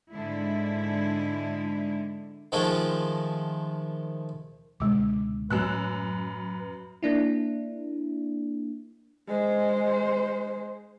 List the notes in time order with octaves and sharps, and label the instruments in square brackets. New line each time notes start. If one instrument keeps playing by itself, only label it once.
[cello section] G#2 D3 G#3 E4
[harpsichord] D#3 F3 G#3 A3 F4
[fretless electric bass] C#2 B2 D3 [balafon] G#3 D6
[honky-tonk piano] F#2 E6 F#6 [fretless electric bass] A2 F#3 [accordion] B4
[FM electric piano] A#3 D4 E4
[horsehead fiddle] G#3 C5